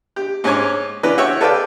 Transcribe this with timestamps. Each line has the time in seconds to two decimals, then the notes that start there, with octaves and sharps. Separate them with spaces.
0.16 G4
0.44 G#2 C#4 C#5 G#5 D6
1.03 E3 C#4 B4 D5
1.18 F#4 C#5 E5 G5
1.41 A4 B4 D5 F5 G5